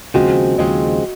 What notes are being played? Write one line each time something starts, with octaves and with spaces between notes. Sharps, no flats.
D#2 C#3 F3 G#3 C4 F#4
D#2 C#3 F3 G#3 C4 D#5